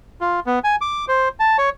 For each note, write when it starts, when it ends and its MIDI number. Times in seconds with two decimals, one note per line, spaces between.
0.21 0.40 65
0.46 0.59 59
0.64 0.76 80
0.81 1.05 86
1.08 1.29 72
1.40 1.57 81
1.58 1.70 73